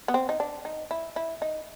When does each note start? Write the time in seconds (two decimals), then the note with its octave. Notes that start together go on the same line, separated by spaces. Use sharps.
0.08 B3
0.14 C4
0.29 D#4
0.40 D4
0.65 D#4
0.91 E4
1.16 E4
1.42 D#4